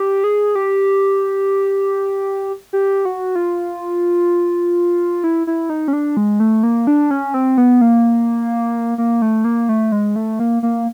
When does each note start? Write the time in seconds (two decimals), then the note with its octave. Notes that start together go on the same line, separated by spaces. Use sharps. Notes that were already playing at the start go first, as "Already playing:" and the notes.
Already playing: G4
0.24 G#4
0.55 G4
2.73 G4
3.05 F#4
3.36 F4
5.24 E4
5.47 E4
5.70 D#4
5.88 C#4
5.93 D4
6.17 G#3
6.40 A3
6.63 A#3
6.87 D4
7.11 C#4
7.34 C4
7.58 B3
7.81 A#3
8.98 A#3
9.22 A3
9.44 A#3
9.69 A3
9.92 G#3
10.16 A3
10.39 A#3
10.63 A#3